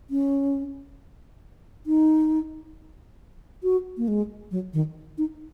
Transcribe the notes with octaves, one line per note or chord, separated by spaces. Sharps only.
C#4
D#4
F#4
A#3
G#3
F#3
D#3
D#4